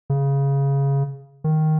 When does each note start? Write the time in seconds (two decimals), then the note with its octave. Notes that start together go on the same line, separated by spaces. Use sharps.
0.10 C#3
1.44 D#3